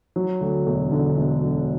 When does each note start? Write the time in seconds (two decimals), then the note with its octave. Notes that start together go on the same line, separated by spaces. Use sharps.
0.16 F#3
0.41 D2
0.66 E1
0.92 D3
1.17 E1
1.42 F#3